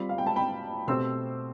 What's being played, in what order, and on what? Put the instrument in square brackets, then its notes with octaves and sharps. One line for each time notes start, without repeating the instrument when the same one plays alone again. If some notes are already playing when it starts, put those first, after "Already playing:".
Already playing: [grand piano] G3 C4 F4 [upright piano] B5
[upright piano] F5
G5
A5
G5 B5
[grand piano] B2 A3 C4 G4 C5 [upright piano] C6 E6